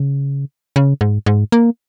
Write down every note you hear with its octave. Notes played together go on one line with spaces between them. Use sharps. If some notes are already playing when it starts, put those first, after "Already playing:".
Already playing: C#3
C#3
G#2
G#2
A#3